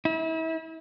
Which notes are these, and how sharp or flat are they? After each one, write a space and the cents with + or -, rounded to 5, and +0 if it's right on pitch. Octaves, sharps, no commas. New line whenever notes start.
E4 -35